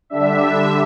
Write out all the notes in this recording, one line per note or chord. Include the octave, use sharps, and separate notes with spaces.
D3 G3 D4 E5